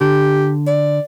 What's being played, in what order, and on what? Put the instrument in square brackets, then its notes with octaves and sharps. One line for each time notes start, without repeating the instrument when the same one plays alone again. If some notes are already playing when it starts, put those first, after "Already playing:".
[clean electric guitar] D3 [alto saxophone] G4
[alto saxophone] D5